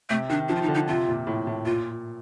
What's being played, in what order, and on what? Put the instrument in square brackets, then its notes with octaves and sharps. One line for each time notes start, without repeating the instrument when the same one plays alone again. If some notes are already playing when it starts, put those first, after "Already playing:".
[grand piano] C3 [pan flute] A3
[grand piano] D#3 [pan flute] D4
[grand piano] F3 [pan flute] D4
[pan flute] F4
D#4
[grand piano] D3
[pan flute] D#4
[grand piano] C3 [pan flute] F4
[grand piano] A#2
A2
A2
[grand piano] A#2 [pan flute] F4